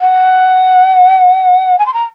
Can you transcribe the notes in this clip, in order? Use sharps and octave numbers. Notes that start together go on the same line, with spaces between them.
F#5
G#5
C6
A#5